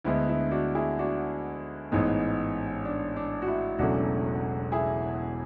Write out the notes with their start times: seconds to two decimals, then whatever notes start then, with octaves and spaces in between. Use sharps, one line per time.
0.05 D2 D3 G#3 B3 E4
0.29 E4
0.51 D4 F#4
0.75 E4 G#4
0.99 D4 F#4
1.91 A1 G#2 G#3 B3
2.85 D4
3.16 D4
3.42 F#4
3.48 E4
3.78 E1 E2 C#3 F#3 A3 D4 F#4
4.72 E4 G#4